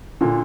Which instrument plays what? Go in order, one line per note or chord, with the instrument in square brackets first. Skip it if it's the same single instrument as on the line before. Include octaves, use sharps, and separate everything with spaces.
[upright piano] A#2 [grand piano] D3